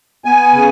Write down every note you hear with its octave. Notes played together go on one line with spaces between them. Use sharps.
B3 G#5
C#3